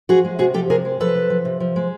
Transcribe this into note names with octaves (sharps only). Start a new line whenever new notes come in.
F3 F#4 G#4
G#3
C3 F#4 G#4
F3 G4 A4
C3 G#4 A#4
G#3
F3 A4 B4
C3
F3
C3
F3
G#3